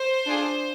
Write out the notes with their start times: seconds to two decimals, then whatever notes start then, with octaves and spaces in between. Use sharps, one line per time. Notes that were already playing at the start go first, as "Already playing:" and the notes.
Already playing: C5
0.26 D4 F4 G#4